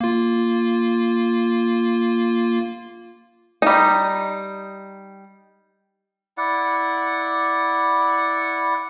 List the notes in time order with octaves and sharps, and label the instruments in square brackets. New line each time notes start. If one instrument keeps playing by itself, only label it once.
[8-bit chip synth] A#3 F4
[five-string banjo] G3 D#4
[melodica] E4 D5 F#5